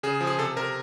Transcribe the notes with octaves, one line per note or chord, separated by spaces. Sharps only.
C#3 G#4
F3
G#4
C3 A4
C3 A#4